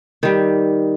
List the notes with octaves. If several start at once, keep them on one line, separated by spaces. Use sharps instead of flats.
D#3 G3